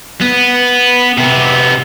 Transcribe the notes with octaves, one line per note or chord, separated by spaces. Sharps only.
B3
C3 B3